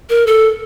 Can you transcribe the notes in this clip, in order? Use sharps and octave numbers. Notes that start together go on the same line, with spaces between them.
A#4
A4